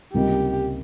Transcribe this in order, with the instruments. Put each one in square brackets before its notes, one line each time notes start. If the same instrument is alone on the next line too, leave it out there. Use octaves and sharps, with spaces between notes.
[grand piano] C#2 C3 G3 A#3 D#4 [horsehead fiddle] G4